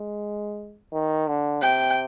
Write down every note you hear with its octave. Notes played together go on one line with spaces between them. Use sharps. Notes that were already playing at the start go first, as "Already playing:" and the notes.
Already playing: G#3
D#3
D3
C3 G5